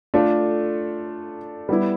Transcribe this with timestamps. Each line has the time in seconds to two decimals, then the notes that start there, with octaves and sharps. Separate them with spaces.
0.14 A3 D4 F4 A4
1.69 G3 B3 E4